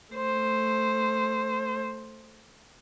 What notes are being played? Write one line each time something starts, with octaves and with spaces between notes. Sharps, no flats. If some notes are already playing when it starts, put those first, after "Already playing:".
A3 C5